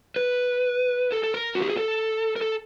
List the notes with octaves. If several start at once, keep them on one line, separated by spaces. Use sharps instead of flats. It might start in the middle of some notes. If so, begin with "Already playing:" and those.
B4
A4
A4
A#4
F#4
G4
G#4
A4
A#4
A4